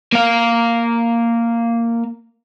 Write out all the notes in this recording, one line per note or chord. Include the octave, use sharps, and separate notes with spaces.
A#3 F5